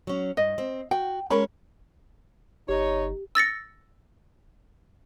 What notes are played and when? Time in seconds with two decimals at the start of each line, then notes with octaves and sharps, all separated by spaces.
0.07 F#3 C#4
0.37 G2 D#5
0.58 C4
0.91 F#4 G5
1.30 G#3 C#4 A#4 C#5 B5
2.69 G1 D#4 G4 C#5
3.35 E6 A6 A#6 C#7